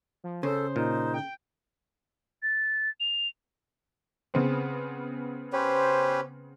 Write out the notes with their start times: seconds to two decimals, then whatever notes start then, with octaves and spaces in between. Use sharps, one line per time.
0.24 F3
0.43 C#3 A4 C5
0.76 A#2 D#4
1.14 G5
2.43 A6
3.00 F7
4.34 C#3 B3 C4
5.53 C#4 G4 B4 C5